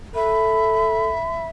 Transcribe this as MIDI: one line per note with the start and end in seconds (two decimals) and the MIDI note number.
0.15 1.14 69
0.15 1.50 76
0.15 1.46 83